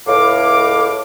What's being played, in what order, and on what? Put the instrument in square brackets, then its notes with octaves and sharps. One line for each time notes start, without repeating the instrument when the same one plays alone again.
[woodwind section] C#2 A2 F5 D6